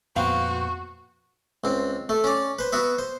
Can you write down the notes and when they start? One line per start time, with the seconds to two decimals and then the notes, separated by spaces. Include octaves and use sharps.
0.16 F2 A#2 B3 C4 F#4 F5
1.64 C#2 C4
2.09 A3
2.24 C#4 D5
2.59 B4 C5
2.72 B3 F#4 E5
2.99 C5